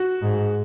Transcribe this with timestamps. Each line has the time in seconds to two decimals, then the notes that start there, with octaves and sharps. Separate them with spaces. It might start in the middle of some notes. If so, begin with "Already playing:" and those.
Already playing: F#4
0.22 G#2